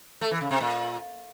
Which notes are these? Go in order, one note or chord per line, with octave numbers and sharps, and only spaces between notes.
A3
E3
C#3
C3
A#2